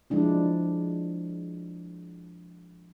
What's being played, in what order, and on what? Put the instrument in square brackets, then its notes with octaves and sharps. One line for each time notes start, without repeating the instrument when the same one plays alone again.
[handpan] F3 G#3 D4 E4